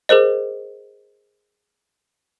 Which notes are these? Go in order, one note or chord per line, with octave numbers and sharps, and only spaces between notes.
G#4 A#4 C5 D#5